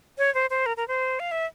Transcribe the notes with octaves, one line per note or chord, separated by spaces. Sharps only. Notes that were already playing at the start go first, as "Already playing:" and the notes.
C#5
C5
C5
A#4
A#4
C5
F5
E5